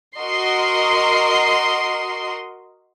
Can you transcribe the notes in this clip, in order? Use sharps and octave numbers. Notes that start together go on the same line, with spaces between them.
F#4 A#4 D#5 C6 C7